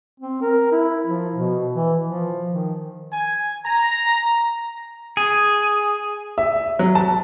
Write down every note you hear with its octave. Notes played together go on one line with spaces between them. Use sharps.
C4
A#4
E4
F3
B2
E3
F3
D#3
G#5
A#5
G#4
E5
F#3
A5